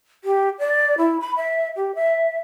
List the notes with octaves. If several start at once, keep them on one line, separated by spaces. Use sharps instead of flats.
G4
D5
E4
B5
E5
G4
E5